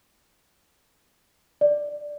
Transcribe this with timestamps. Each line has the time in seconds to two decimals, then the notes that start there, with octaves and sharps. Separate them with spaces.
1.61 D5